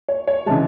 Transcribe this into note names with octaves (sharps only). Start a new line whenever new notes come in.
C#5
C#5
C#3 E3 G#3 A5